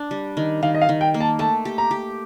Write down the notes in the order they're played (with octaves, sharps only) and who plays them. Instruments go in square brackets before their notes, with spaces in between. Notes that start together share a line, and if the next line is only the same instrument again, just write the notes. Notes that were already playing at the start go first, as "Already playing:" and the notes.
Already playing: [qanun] D4
G3
D#3
[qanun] D#3 [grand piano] F5
[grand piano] D#5
F5
[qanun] D#3
[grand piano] G5
[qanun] A#3
[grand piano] A5
[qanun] A3 [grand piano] A5
[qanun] G4
[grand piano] A#5
[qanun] G4